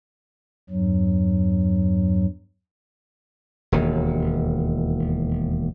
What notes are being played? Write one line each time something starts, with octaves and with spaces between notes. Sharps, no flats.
E2 G2 F#3
E1 D#2